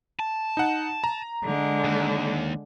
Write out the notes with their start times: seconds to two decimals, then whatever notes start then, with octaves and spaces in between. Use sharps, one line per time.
0.19 A5
0.57 D#4 F#5
1.04 A#5
1.44 D3 G#3
1.84 D#2